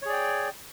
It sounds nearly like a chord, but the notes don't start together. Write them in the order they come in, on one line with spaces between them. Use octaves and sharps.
C#5 G#4 D5 G5